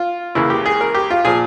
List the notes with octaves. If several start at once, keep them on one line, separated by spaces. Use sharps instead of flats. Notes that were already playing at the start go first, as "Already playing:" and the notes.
Already playing: F4
C#2 C#3 E3 A#3 E4
G4
G#4
A#4
G4
F4
A#2 F3 G#4